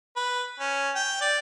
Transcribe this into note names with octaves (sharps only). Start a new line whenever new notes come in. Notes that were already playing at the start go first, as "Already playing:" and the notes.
B4
C#4
G5
D5